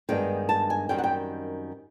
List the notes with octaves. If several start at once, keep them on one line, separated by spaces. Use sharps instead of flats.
G2 D#3 G#3 B3 D4 G5
A5
G#5
F#2 D#3 G3 C4 D#4 G5
F#5
G5